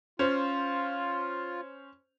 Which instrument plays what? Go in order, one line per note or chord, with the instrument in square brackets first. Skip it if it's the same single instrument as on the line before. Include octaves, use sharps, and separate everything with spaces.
[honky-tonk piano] C#4 C5 [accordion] F4